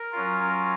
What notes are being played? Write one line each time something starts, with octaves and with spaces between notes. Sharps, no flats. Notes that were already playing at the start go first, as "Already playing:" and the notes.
Already playing: A#4
F#3 C#4 F4